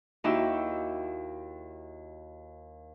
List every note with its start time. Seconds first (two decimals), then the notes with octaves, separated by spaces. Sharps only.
0.24 D#2 D#4 E4 F#4 G4 E6